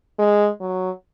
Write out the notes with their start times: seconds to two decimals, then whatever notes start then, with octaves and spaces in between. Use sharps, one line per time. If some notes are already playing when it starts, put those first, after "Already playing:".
0.19 G#3
0.61 F#3